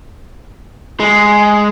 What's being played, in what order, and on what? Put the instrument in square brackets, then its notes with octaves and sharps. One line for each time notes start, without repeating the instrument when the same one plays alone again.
[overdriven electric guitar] G#3